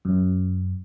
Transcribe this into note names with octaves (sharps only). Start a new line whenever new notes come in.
F#2